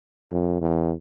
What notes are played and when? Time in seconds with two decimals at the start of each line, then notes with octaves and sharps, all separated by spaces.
0.32 F2
0.61 E2